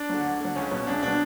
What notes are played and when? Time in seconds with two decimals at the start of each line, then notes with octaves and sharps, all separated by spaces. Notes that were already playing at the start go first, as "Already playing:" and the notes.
Already playing: D4
0.09 D3 F#3
0.25 D2
0.41 D3 F#3
0.56 C#2 C#4
0.71 B2 F#3
0.87 C#2 D4
1.02 B2 F#3 D4